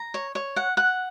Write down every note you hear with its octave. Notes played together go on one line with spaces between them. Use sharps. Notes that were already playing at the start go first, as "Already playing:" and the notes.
Already playing: A#5
C#5
C#5
F#5
F#5